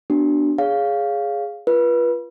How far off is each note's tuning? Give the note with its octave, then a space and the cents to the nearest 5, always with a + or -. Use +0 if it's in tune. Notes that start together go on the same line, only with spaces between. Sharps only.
B3 +0 D4 +0 F#4 +40
G#4 +0 C#5 +25 F5 +0
F4 -25 B4 -30